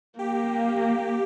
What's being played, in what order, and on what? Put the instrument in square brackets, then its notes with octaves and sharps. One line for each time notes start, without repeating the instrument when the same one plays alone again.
[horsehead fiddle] A#3 [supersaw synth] G4